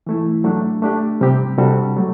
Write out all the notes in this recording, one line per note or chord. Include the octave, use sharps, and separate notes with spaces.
E3 A3 E4
F#3 A3 D4
A3 D4 G4
C3 G3 C4 G4
C3 G3 D4 F#4 A4
F#3 A3